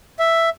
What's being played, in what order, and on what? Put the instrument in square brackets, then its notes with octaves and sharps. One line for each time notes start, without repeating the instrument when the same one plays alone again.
[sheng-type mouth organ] E5